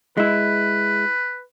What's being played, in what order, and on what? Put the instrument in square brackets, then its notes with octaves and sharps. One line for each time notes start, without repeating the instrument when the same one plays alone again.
[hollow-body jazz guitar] G#3 E4 [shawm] B4